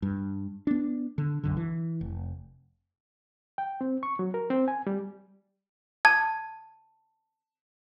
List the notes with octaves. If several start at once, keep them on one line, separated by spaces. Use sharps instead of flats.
G2
B3 D4
D3
B1 F#2 D3
E3
F1
G5
C4
C#6
F#3
A#4
C4
G#5
G3
A5 G#6